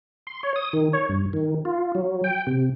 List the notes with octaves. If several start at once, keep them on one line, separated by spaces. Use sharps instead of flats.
C6
C#5
D#6
D#3
C#5
G2
D#3
F4
F#3
G5
C3